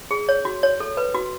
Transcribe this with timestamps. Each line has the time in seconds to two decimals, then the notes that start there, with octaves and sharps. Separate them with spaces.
0.11 G#4
0.29 C#5
0.45 F#4
0.63 C#5
0.80 A4
0.97 B4
1.15 F#4